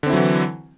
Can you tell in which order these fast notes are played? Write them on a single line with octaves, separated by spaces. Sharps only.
D3 C4 E4 F#3 E3